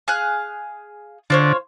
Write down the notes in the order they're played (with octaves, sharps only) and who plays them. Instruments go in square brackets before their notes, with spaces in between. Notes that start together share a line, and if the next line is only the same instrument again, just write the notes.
[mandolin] G#4 F5 F#6
[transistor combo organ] D3 [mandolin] F4 C5 C#5